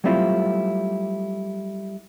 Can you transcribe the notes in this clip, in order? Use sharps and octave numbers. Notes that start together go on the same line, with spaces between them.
F#3 G3 A3 C4 E4 F4